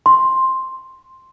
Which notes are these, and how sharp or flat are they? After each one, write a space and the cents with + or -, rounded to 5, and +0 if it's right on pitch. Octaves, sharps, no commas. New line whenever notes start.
C6 +5